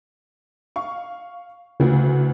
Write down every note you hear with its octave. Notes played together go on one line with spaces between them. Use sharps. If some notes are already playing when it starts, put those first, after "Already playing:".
F5 C#6
D2 C#3 E3